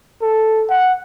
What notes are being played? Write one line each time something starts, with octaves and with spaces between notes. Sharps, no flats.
A4
F#5